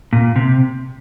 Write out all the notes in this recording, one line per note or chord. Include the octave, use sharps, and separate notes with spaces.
A#2
C3